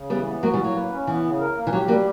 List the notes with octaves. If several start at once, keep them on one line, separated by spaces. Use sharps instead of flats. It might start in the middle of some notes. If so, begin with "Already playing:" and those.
Already playing: C#3
E3 G3 B3
B3
F#3 A#3 F#4
E3 G3
A#3
F#3
B4
C#4
E3 B3
C#3
A#4
A#3
E3
F#3 G4
F#3 G3 A#3